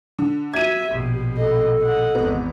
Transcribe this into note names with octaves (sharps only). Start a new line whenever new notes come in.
D3
F#4 E5 G#6 D#7
A#1 B2 G4
A4 D#5
D#5 F#5
G#1 E2 B3